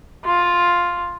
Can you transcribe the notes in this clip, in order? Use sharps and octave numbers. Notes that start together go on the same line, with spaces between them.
F4